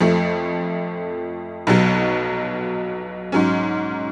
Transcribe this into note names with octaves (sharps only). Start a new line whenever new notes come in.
F2 F3 A3
B1 B2 F#3
G#2 F#3 C#4